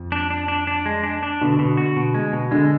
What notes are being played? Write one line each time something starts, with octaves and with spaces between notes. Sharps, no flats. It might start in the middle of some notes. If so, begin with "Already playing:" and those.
Already playing: F2
D4
D4
D4
D4
G#3
D4
D4
B2 D3
B2
F#4
B2
G#3
B2
D3 G#3